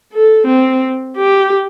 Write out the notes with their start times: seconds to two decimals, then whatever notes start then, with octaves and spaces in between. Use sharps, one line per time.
0.13 A4
0.47 C4
1.17 G4